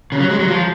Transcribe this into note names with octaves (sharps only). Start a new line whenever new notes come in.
C#3
F#3
G#3
F#3
F3